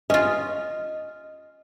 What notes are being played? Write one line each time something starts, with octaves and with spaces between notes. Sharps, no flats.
C#4 F4 D#5